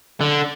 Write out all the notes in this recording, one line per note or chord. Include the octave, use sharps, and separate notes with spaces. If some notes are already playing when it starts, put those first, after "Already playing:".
D3